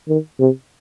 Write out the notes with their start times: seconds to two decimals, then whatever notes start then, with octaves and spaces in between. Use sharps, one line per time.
0.08 D#3
0.40 C3